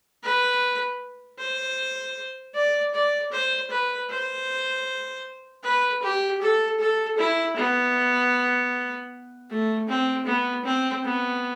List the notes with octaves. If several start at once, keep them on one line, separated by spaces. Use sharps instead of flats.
B4
C5
D5
D5
C5
B4
C5
B4
G4
A4
A4
E4
B3
A3
C4
B3
C4
B3